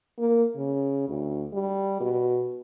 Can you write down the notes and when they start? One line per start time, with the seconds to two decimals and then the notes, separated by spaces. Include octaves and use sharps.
0.19 A#3
0.57 C#3
1.08 D2
1.53 G3
2.00 B2